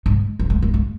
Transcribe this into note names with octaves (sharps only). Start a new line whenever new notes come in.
G#2
F3
G#3
A#3
G#3